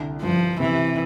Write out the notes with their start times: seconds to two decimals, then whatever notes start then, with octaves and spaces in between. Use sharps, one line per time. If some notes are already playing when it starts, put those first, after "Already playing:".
Already playing: C2 D3
0.22 G2 F3
0.60 C3 E3